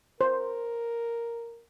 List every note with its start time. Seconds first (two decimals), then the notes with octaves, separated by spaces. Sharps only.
0.21 A#4 C5